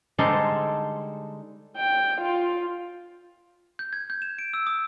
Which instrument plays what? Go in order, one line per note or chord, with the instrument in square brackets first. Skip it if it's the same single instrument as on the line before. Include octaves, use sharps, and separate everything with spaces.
[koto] D3 G3 G#3 D#4 A4 C5
[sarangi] G5
F4
[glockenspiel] G6
G#6
G6
E7
D7
E6
D#6